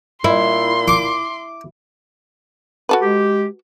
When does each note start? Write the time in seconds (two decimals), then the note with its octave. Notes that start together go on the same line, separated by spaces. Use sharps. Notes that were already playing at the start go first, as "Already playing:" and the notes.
0.24 A#2 E4 C6
0.88 D6
2.89 F#4 A4 B4
3.02 G#3 G4